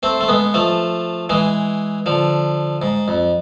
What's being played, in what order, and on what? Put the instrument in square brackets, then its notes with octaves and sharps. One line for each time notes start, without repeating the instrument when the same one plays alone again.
[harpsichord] A3 C4
A3
G#3 B3
F3 A3
E3 G#3
D3 F3
G#2
F2